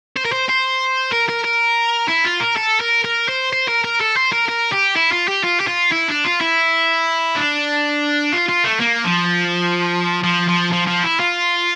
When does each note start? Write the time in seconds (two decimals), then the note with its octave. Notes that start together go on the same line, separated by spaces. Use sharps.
0.17 C5
0.25 A#4
0.32 C5
0.49 C5
1.12 A#4
1.29 A#4
1.44 A#4
2.08 E4
2.24 F4
2.40 A#4
2.56 A4
2.80 A#4
3.04 A#4
3.28 C5
3.53 C5
3.68 A#4
3.84 A#4
4.01 A4
4.17 C5
4.33 A#4
4.49 A#4
4.72 G4
4.96 E4
5.12 F4
5.28 G4
5.44 F4
5.61 G4
5.68 F4
5.92 E4
6.09 D4
6.24 F4
6.41 E4
7.36 D4
8.33 F4
8.49 F4
8.64 A3
8.80 A#3
9.04 F3
10.24 F3
10.49 F3
10.73 F3
10.87 F3
11.04 E4
11.20 F4